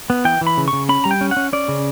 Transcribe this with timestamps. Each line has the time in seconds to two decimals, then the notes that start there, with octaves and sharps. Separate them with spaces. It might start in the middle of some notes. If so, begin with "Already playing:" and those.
0.10 B3
0.25 E3 G5
0.41 E3
0.47 B5
0.57 C#3
0.68 C#6
0.73 C#3
0.89 C#4 B5
1.04 G3 A#5
1.11 G5
1.21 C#4
1.31 F#5
1.37 C#4
1.53 C#4 D5
1.68 C#3